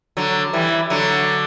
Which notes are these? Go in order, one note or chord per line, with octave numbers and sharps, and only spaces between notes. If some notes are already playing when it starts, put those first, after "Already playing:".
D3 F#3
E3 G3
D3 F#3